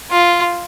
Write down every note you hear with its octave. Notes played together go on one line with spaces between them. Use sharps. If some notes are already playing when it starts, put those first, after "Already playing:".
F4